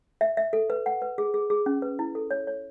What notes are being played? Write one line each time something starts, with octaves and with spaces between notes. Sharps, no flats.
E5
E5
A4
B4
F#5
B4
G#4
G#4
G#4
C#4
B4
E4
A4
C#5
C#5